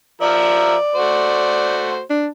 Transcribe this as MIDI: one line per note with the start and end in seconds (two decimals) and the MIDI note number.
0.21 0.75 53
0.21 0.75 70
0.21 1.97 74
0.21 0.75 76
0.95 2.01 57
0.95 2.01 66
0.95 2.01 72
2.10 2.28 62